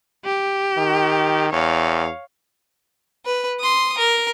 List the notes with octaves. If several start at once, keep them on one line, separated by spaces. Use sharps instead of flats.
G4
D#3
E2 C#5 F5
B4
C6 D#6
A#4